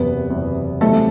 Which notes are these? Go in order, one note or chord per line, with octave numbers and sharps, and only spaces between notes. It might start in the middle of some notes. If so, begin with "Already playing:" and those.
Already playing: F#1 E2 C3 B3
F#1 E2 C3
F#2 C#3 E3 G3 A3 C4 A4